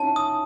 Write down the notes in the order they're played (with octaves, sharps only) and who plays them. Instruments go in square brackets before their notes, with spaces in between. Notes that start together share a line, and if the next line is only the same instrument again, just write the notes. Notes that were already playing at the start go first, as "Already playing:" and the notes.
Already playing: [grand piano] C#4 D#4 E4 [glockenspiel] A5
[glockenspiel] D#6